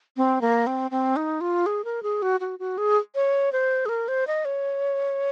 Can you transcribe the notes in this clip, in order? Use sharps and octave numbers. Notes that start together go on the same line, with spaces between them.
C4
A#3
C4
C4
D#4
F4
G#4
A#4
G#4
F#4
F#4
F#4
G#4
C#5
C5
G#4
A#4
C5
D#5
C#5